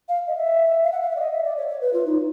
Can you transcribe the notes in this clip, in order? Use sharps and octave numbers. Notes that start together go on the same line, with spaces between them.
F5
D#5
E5
F5
F#5
F5
E5
D5
D#5
E5
D5
C#5
C#5
B4
F4
D#4